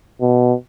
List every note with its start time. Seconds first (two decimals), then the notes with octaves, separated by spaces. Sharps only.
0.21 B2